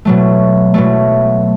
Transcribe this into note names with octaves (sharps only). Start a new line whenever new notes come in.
B2 F#3 A3
B2 F#3 A3